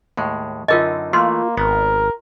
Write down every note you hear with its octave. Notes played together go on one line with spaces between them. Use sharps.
D#2 A2 G#3
F#2 D3 D#4 F4 A#4 D#5
E3 A3 A#3 F4 C6
G#1 B3 A#4